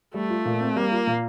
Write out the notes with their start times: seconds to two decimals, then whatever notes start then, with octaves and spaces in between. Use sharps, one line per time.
0.14 G3 A3
0.30 F4
0.45 A#2
0.61 C4
0.76 G3 A#3
0.92 F4
1.07 A#2